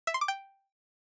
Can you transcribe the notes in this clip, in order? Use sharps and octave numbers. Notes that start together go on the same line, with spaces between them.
E5
C6
D6
G5